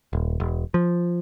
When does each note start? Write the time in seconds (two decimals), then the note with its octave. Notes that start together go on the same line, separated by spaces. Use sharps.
0.13 D#1
0.40 E1
0.74 F3